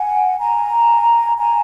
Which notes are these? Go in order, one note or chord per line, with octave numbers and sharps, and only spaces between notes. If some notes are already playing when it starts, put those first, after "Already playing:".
Already playing: F#5 G#5
G#5 A#5
G#5 A#5